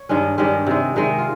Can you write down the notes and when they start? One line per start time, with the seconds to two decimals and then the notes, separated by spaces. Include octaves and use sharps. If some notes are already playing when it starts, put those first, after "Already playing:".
Already playing: C#5
0.09 G2 D#3 G#3 C#4
0.38 G2 D#3 G#3 C#4 G4
0.67 C3 D#3 G#3
0.96 C3 D#3 G#3
1.18 F4